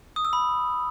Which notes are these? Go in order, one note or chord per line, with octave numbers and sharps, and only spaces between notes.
D#6
E6
B5